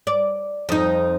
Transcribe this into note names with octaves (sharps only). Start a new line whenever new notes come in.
D5
F2 D#4